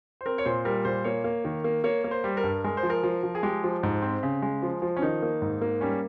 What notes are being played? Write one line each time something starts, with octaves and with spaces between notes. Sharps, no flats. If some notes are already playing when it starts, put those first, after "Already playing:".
C5
C4 A#4
C#5
A#2 C5
G3 A#4
A#2 C5
A#3 C#5
A#3
D#3
A#3
A#3 C#5
A#3
C5
G3
A#4
G2
G#3 A#4
C5
F3
A#4
F3
F3
G#4
G#3 G4
F3
G#2
C4
C#3
G#3
F3
F3
C#4
D#3 D#4
A#3
G#2
A#3
G3 C#4